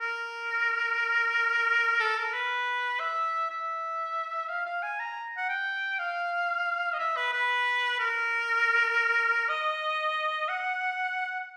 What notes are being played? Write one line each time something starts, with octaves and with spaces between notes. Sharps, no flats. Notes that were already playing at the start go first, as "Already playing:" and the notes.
A#4
A4
A#4
B4
E5
E5
F5
F5
G#5
A#5
F#5
G5
F5
D#5
E5
B4
B4
A#4
D#5
F#5